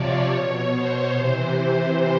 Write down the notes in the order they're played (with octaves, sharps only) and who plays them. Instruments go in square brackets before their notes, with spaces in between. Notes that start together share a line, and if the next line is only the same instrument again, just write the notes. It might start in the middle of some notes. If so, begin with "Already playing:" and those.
Already playing: [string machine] C3 F3 C#5 D5
B2
C5
C3 E3